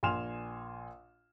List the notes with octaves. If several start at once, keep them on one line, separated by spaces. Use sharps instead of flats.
A#1 G#5 C6 F6 E7 F7